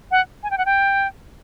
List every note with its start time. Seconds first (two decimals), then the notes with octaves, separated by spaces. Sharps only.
0.11 F#5
0.43 G#5
0.51 G5
0.58 F#5
0.66 G5